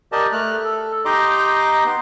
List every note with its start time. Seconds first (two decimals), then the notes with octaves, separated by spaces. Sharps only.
0.12 G4 A#4 D5 D#5 A5
0.32 A3 F6 F#6
0.64 A4
1.05 D#4 G4 D#5 A#5 C6 D6
1.85 B3 C6